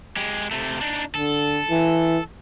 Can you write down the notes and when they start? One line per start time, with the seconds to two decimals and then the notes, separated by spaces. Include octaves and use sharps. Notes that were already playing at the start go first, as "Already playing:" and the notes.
0.17 G#3 G4
0.51 C3 A3
0.81 D4 D#4
1.15 D3 A4
1.70 E3